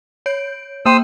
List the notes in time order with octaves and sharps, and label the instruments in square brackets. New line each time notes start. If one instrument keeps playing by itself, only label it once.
[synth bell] C#5 G6 D7
[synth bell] A#3 G5 [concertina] C5 D#6 E6